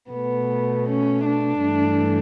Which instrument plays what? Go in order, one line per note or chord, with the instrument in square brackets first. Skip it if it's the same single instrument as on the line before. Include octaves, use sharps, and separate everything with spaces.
[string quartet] B2 A3 B3
C#4
D4
G2 E3 A3